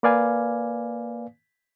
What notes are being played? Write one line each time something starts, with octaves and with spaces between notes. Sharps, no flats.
A#3 B4 D5 F5 G#5